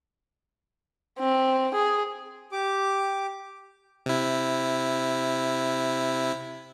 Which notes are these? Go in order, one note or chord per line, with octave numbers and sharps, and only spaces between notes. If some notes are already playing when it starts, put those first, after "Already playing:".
C4
G#4
G4 D6
C3 E4